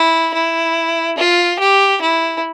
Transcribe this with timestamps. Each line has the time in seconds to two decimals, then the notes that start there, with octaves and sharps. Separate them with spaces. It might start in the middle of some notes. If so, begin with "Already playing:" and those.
Already playing: E4
0.34 E4
1.18 F4
1.59 G4
2.02 E4